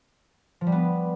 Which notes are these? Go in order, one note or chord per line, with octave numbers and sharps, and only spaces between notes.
F3
G3
B3